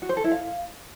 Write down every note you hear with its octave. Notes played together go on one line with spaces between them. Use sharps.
F#4
C5
A4
E4
F5